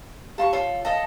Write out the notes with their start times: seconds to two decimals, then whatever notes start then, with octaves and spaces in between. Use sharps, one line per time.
0.38 G4 F5 A5 C6 C#6
0.53 F4 A4 C#5
0.85 A4 D#5 F5 A5